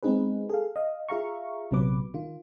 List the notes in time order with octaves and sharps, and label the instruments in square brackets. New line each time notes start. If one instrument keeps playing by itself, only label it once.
[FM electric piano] G#3 B3 C4 D#4 G#4 B4
G#4 A4 F5
D#5 F5
F4 G#4 E5 F5 A#5 C#6
A#1 C3 F#3 B3 B4 D6
D#3 F4